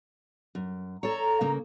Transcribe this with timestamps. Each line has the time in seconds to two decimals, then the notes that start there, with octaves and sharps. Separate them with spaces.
0.55 F#2
1.03 A4 C#5 A#5
1.41 C#3 A#3